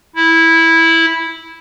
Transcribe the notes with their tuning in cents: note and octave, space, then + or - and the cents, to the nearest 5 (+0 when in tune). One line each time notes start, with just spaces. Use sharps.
E4 -10